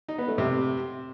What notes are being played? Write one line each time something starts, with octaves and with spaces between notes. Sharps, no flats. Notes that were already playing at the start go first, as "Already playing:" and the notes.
D#4
B3
A3
C3